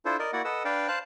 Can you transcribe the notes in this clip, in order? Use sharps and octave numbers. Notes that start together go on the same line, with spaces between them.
D4 E4 F4 A4 C5
A#4 D5 D#5
A#3 E4 F#4 D5 F#5
A4 B4 D#5 F#5 E6
D4 B4 D5 F5 G5
C5 F5 A5 F#6